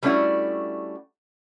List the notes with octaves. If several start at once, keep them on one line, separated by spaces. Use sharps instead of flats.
G3 A3 C#4 D4 E4 F#4